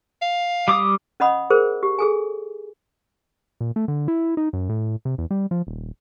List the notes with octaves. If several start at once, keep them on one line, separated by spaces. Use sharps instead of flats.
F5
G3 D6 D#6
C#4 D#5 F#5 B5 D#6
G#4 A#4 C5
G4
G#4 A4 G#5
A#2
A3
D3
E4
D#4
F#2
A2
C3
E2
G3
F3
D#1